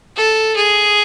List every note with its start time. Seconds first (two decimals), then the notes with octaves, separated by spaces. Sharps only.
0.17 A4
0.56 G#4